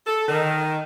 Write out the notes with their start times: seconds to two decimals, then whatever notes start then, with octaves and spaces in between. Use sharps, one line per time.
0.06 A4
0.28 D#3